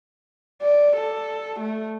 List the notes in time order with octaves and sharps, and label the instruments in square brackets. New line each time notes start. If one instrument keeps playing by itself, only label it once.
[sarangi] D5
A4
A3